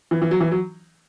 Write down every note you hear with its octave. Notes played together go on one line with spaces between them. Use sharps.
E3
E3
F#3
E3
F#3